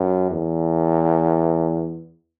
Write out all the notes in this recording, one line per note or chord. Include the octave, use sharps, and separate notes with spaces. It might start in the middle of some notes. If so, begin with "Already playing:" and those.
Already playing: F#2
E2